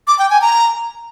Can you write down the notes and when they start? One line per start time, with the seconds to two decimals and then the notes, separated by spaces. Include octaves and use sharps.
0.07 D6
0.19 G5
0.30 G#5
0.41 A#5